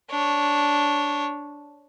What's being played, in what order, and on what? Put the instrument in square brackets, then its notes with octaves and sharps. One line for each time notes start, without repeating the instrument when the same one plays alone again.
[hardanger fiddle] D4 C#5